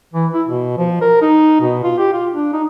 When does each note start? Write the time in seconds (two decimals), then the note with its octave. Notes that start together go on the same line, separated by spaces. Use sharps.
0.14 E3
0.34 E4
0.47 B2
0.78 F3
1.01 A#4
1.22 D#4
1.61 B2
1.83 F4
1.98 G4
2.13 F4
2.34 D4
2.53 D#4